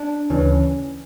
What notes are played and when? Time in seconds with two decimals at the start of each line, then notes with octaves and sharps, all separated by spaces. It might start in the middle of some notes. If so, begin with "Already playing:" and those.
Already playing: D4
0.30 D2 C#3 E3 C#4